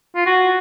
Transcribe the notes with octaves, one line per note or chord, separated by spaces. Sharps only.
F4
F#4